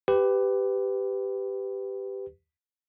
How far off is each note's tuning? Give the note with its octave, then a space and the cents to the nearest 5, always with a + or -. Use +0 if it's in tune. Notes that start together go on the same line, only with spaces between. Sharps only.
G4 +0 B4 +20